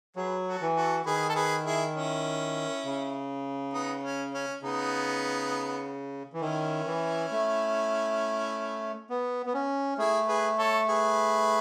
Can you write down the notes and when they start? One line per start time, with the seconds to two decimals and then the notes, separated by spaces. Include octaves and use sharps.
0.16 F#3 G#4 B4
0.47 F#4 A4
0.61 E3
0.76 F#4 A4
1.05 D#3 G#4 B4
1.29 A4
1.35 G#4 B4
1.65 E4 G#4
1.95 C#4 E4
2.85 C#3
3.73 B3 D#4
4.03 C#4
4.33 C#4
4.62 C#3 B3 D#4
6.33 E3
6.41 D#3 C#4 E4
6.86 E3
7.31 A3
9.10 B3
9.46 B3
9.54 C#4
9.98 A3 E4 G#4
10.28 G#4 B4
10.58 A4 C#5
10.88 G#4 B4